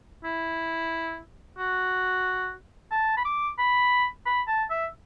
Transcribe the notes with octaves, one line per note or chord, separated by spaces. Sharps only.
E4
F#4
A5
B5
D6
B5
B5
A5
E5